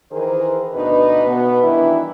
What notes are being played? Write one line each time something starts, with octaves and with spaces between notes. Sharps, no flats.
D#3 E3 G#4 A#4 C5
D2 B2 D4 D#4 B4
B2 B3
D#3 E3 G3 D4 E4